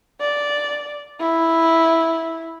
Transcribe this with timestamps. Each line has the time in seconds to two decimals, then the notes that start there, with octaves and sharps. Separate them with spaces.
0.21 D5
1.20 E4